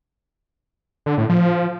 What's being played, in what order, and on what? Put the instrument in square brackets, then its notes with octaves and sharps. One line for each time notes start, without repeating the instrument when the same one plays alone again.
[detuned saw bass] D3
A2
F3